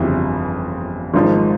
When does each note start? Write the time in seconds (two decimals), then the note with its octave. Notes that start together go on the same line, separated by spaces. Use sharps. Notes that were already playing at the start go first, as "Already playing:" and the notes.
Already playing: G1 F2 C#3 E3 G3
1.14 G#1 G#2 F3